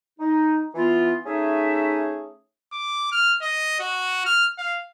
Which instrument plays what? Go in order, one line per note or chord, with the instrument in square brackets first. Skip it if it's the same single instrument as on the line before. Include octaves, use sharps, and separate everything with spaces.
[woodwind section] D#4
E3 B3 F4
A3 C#4 D#4 G#4 E5
[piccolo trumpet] D6
F6
D#5
F#4
F6
F5